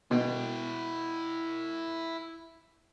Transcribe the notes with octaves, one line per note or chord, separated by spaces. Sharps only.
B2 E4 G5